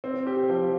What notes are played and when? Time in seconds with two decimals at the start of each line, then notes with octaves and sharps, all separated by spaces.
0.04 C4
0.27 G4
0.50 F3